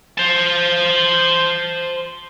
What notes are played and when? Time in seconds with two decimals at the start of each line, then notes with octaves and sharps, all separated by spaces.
0.18 C5 A5